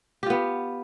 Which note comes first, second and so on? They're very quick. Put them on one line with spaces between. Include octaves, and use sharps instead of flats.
G4 F4 B3